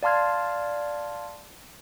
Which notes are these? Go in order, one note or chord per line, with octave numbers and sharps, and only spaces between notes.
D5 F5 A5 C6 F6 G#6